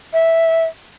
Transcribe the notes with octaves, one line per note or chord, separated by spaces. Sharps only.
E5